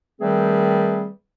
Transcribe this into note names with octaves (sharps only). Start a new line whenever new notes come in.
D#3 G3 A3 C4 G#4 B4